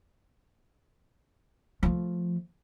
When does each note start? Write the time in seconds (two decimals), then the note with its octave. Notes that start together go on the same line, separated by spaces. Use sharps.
1.83 F3 A3